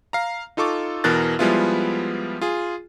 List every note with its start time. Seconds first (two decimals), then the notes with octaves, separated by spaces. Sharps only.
0.13 F5 A#5
0.57 D#4 F4 A4 C#6 D6
1.04 E2 B2 E3 A#4 F#6 A6
1.39 F3 G3 G#3 B3 E4 F4
2.41 F4 G#4